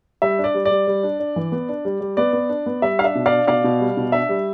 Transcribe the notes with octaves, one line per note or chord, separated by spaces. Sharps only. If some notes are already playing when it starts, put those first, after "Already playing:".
G3 E5
D4
D5
G3
D5
G3
G3
D4
D4
E3
B3
D4
G3
G3
B3 D5
B3
D4
B3
G3 E5
D4 F5
E5
B2
D5 F5
D4
B2 D5 F5
B2
G3
B2
D4 E5
G3